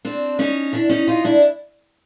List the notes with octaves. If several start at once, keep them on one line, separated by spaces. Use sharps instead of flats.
C4 D4
C#4 D#4
D4 E4
C#4 D#4
D#4 F4
D4 E4